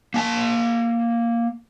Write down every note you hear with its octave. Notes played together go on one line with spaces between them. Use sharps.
A#3 G#5 A5